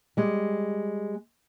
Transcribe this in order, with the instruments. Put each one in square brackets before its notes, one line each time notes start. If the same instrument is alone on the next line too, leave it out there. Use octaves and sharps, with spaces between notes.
[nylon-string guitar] G3 G#3